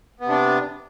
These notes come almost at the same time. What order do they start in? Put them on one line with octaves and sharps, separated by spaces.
B3 C3 D4